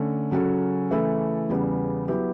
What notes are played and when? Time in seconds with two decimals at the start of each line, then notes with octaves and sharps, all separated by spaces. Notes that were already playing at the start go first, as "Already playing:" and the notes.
Already playing: D3 A3 C#4
0.31 C#3 F#3 C#4 F#4 A4
0.91 C#3 E3 A3 E4 A4
1.49 E2 C#3 G3 B3
2.08 F#3 B3 E4 G4